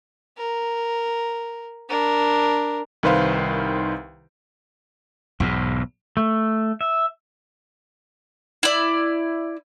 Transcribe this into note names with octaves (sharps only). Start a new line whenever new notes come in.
A#4
D4 A#4
C2 D#3 B4 C5 F5
B1 E2 G#2
A3
E5
E4 D5